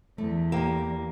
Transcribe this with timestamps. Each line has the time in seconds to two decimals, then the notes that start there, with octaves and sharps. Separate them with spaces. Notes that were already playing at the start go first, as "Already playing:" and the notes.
0.18 E2 A3
0.52 A#3 G4 G5